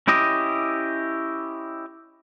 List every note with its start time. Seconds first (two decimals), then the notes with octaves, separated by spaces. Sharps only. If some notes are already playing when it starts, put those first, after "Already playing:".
0.08 C#4 E4 G4 D#5